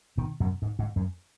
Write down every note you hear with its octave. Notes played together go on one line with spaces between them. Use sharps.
B2 D#3
F#2 B2
G#2
G#2
F#2